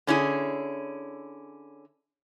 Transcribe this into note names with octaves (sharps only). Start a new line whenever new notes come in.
D3 C#4 E4 G#4